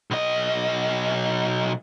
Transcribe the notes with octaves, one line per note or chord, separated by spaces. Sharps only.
B1 D#5